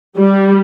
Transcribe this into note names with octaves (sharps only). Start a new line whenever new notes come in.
G3